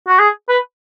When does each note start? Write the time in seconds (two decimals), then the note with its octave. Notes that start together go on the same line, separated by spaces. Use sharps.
0.08 F#4
0.19 G#4
0.49 B4